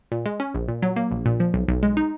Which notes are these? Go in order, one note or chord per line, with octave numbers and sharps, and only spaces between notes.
A#2
G#3
C#4
A#1
A#2
F#3
A#3
A#1
A#2
F3
B1
B1
G#3
D#4